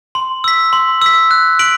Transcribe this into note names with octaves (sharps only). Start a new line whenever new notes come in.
C6
E6 B6
C6
E6 B6
F#6
B6 D7 F#7